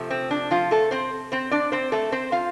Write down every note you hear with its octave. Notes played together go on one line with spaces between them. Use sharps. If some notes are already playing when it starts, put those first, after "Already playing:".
Already playing: C3 F3 A3
C4
D4
F3 F4
A3 A4
C4 C5
C4 C5
D4 D5
C4 C5
A3 A4
C4 C5
F4 F5